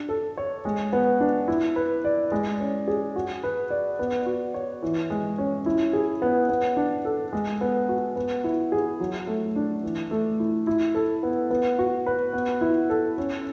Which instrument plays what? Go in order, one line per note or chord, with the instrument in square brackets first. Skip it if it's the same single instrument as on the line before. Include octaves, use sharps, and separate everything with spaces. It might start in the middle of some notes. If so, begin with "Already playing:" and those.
Already playing: [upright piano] D4
A4
C#5
G#3
B3
D4
E4
B4
D5
G#3
C#4
G#4
F#4
B4
D5
B3
F#4
C#5
E3
G#3
C#4
E4
G#4
B3
B3
D4
A4
G#3
B3
F#4
B3
E4
G#4
F#3
A3
D4
E3
A3
E4
E4
A4
B3
B3
F#4
B4
B3
E4
A4
C#4